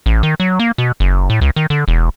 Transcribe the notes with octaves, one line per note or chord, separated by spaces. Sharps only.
A1
D#3
F#3
A#3
B2
F#1
A2
C#2
D#3
D3
E1